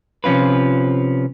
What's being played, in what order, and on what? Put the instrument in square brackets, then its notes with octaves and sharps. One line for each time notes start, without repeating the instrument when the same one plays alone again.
[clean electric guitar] C3 F3 C#4 F4 B4